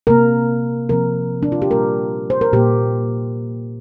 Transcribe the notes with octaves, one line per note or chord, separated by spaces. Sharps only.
C3 A#3 A#4
C3 F3 C4 A#4
D4
F4
G4
A#2 G3 A#3 A#4
C5
A#4
A#2 A#3 G4